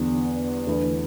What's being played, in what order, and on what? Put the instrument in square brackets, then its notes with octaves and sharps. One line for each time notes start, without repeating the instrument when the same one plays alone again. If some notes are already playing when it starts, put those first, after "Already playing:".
Already playing: [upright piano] E2 D3 G3 B3
E2 D3 A3 E4 B4